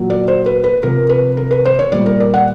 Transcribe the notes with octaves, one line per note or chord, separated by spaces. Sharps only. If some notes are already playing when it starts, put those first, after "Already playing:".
Already playing: A#2 F#3
D5
C5
B4
B4
C3 F3 A#4
B4
A#4
B4
C5
C#5
A#2 G3 D5
A#4
D5
F#5